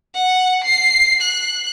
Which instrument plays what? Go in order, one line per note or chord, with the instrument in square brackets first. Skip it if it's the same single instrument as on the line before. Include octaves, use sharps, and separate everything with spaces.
[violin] F#5
C7
F#6